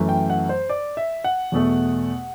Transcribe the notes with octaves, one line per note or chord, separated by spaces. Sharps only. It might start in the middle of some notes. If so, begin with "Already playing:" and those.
Already playing: F#2 E3 A3
G5
F#5
C5
D5
E5
F#5
E2 B2 A3